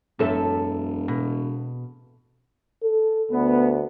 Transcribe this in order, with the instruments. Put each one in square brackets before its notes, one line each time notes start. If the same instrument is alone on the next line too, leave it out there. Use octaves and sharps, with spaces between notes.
[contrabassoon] E1 [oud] F#2 A4 E5
[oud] B2
[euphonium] A4
[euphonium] D2 [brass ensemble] B3